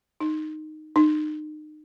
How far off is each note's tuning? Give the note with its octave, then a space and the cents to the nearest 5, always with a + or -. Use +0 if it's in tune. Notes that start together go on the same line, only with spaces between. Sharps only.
D#4 -10
D#4 -35